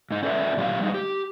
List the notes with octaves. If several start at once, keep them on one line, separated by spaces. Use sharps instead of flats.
G#2 D#4
C#4 A4 B4 D5 E5
A#2 F#3 C#4 G4 F5
G3 G#3 D#4
G4